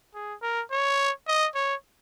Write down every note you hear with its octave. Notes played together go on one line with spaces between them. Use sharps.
G#4
A#4
C#5
D#5
C#5